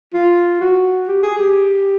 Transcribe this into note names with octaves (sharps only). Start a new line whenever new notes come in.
F4
F#4
G4
G#4
G4